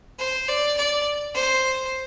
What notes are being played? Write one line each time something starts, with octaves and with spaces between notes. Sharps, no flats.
C5
D5
D5
C5